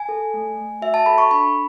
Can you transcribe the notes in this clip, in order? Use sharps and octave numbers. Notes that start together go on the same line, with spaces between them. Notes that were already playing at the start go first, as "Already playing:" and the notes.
Already playing: G#5
A4
A3
A3
F#4 E5
A5
A4 B5
C#6
D4 B5